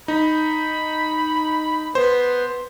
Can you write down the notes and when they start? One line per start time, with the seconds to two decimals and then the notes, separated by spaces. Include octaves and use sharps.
0.08 D#4 B5
1.95 B3 C5